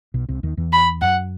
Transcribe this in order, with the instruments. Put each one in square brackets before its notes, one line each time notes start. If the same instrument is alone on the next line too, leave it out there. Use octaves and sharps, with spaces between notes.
[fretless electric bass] B1 B2
C2 C3
D#2 D#3
E2 E3
[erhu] B5
[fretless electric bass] F#2 [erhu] F#5